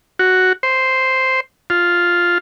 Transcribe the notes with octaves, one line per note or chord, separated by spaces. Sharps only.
F#4
C5
F4